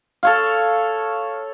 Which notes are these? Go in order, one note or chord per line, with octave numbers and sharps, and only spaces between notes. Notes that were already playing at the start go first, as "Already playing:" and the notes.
A4 C#5 F5